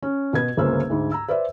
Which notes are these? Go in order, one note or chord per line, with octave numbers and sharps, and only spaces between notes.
C#4
B2 B4 G#6
G1 C#2 A#3 C#4 C5 E6
D2 G#2
A#5 E6
B4 C5 D5 E5